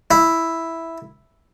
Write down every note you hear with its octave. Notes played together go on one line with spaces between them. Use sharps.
E4